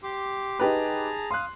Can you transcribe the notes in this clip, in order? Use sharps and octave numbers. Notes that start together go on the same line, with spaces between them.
G4 C6 D6
D#4 G4 G#4 B4 A5 A#5
F5 C6 D#6 F#6